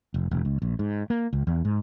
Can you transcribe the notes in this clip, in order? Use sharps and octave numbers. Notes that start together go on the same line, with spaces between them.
F1
E1
C#2
A#1
G#2
A#3
C#2
E2
G#2